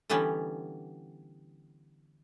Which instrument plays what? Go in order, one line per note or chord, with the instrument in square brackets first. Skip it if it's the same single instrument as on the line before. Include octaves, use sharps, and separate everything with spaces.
[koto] D3 E3 G3 B3 C#4